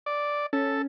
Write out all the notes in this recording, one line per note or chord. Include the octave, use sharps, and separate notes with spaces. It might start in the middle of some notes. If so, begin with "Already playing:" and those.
D5
C#4 A4